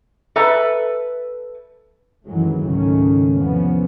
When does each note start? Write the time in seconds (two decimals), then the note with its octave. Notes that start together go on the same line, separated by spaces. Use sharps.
0.36 A4 B4 E5 A#5
2.25 F#2 D#3 E3 F#3 G#3 A3
2.65 C#2 G#2 D#3 A3 C#4
3.33 E2 C3 F3 B3 C#4